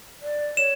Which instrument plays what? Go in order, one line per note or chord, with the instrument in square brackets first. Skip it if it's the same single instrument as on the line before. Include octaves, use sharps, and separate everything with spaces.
[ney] D5
[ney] C#5 [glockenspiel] E7